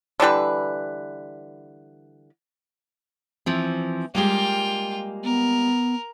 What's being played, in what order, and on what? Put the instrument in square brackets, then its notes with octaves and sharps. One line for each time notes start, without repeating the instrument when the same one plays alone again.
[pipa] D3 E3 G3 B4
[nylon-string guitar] E3 F3 C4
[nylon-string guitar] G3 G#3 A#3 [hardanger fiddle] F4 G5
[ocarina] B3 [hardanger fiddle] A#4